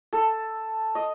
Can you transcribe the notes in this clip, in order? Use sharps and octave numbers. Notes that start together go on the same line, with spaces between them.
A4
D#5